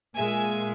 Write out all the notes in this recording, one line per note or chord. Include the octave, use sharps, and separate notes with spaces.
A#2 G#3 E5 G#5